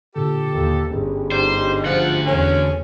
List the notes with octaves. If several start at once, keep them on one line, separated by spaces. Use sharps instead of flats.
A#2 D3 G4 A4
D#2
G1 C#4 G#4
D3 G3 D#4 C5
D2 F3 F#5
E2 C#4 A4